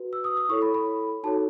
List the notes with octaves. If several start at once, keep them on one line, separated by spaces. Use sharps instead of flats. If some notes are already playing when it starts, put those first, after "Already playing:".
Already playing: F#4 B4
E6
D#6
D#6
E4 A4 C#5 C#6
B5
B5
D#4 F#4 A4 C#5 A5